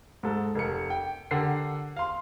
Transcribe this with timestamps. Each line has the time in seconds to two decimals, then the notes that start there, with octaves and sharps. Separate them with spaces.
0.23 G#2 A4
0.55 F1 A#4 C#7
0.90 G5
1.31 D3 G4 A#4 F#5 C7
1.97 F5 C6